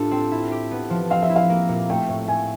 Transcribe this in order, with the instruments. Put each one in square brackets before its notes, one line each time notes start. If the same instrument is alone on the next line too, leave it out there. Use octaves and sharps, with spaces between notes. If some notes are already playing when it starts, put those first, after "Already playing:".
Already playing: [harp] A2 A3 D4 F4 G4 A4 [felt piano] A5
[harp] C4
E4
G4
B3
F3
[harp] C4 [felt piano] F5
[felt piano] E5
[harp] E4
[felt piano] F5
[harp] A#3
A#2
[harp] A3 [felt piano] G5
[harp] A2
[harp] A3 [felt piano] G#5